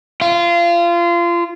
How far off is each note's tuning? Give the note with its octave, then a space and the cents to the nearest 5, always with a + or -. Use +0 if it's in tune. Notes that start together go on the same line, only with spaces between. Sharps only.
F4 -25